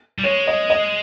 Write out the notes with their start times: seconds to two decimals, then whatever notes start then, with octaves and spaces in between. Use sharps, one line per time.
0.19 G3
0.24 G#3 C#5
0.47 D#5
0.70 D#5